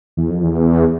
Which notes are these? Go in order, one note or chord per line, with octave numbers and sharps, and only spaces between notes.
E2
F2
E2